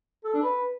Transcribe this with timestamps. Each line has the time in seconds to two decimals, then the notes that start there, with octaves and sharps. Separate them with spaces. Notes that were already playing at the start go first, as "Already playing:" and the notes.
0.24 A4
0.34 D4
0.43 B4